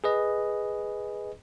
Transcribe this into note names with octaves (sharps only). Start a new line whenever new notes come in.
G#4 B4 D#5